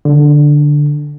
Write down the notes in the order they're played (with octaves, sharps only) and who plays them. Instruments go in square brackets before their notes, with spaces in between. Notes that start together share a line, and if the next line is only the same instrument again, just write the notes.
[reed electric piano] D3